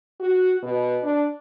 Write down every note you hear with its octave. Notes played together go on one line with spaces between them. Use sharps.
F#4
B2
D4